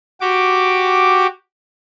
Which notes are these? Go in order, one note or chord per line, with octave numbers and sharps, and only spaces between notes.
F#4 G4 D6